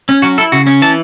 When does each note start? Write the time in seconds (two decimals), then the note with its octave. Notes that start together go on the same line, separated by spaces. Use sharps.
0.09 C#4
0.22 F#3 F#4
0.38 E4 A4
0.52 C#3 F#4
0.67 C#4
0.82 E3 A5